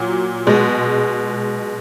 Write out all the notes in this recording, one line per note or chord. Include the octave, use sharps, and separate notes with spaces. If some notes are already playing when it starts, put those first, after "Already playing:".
Already playing: A#2 F#3
B2 G#3